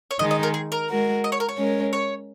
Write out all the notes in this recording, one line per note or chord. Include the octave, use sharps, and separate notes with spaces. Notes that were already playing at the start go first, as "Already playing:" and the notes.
C#5
D#3 G#3 D#4 D#5
D#5
A#4
G#4
A#4
G#3 F#4 A#4
D#5
C#5
A#4
C#5
G#3 C#4 A#4
C#5